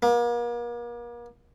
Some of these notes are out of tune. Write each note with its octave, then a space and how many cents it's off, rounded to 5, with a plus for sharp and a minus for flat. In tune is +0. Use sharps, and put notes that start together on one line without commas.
A#3 +40